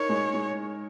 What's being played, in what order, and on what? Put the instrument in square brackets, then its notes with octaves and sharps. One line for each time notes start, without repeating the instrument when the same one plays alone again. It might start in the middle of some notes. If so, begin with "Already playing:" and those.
Already playing: [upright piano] D#4 A#4 [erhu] C#5
[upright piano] G#3
G#3